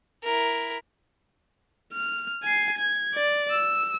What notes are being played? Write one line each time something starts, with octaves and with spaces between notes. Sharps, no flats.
E4 A#4
F6
G#5 C7
G#6
D5
E6